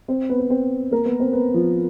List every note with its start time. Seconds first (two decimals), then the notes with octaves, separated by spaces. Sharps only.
0.08 C4 C5
0.29 B3 B4
0.39 B4
0.50 C4 C5
0.91 A#3 A#4
1.05 B3 B4
1.20 C4 C5
1.33 B3 B4
1.54 F3 F4